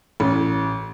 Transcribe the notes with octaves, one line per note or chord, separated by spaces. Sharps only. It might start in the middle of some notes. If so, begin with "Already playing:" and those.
A1